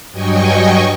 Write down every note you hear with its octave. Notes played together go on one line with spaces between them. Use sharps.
G2 F#3 D#5 G5 G#5 C#6